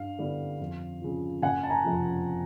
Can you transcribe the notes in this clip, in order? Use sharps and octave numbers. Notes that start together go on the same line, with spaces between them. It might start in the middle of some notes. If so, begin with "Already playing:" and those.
Already playing: G2 F5
D3 G3 B3 E4
F2
C#3 F3
F#1 F#5 G#5
A5
G#5 A#5
F2 C3 F3